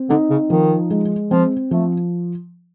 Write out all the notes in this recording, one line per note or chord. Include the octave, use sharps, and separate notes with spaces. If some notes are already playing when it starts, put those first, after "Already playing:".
Already playing: C4
D3 D#4
C#3
D#3 F3
G#3
F3 C4
F3 A3